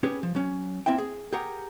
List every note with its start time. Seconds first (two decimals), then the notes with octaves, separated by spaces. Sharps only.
0.03 C#4 G4 G#4 B4
0.23 F3
0.35 F#3 C#4
0.86 A#3 C4 E4 E5 G5
0.98 G#4
1.33 G4 G#4 A#4 F#5